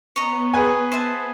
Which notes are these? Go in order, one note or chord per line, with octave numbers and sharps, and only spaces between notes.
B3 C#5 D#5 A#5
G#4 B4 G#5
C5 E5 A5